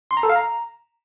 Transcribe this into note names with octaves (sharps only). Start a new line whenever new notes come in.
C6
A#5
A4
F5
A#5